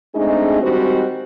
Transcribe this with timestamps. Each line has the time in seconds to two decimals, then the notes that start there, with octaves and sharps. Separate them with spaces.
0.15 G#3 A3 C4 D4 D#4 G#4
0.61 D#3 G3 G#3 C4 F#4 C5